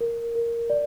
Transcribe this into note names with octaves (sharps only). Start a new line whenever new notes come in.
A#4
A#4
D5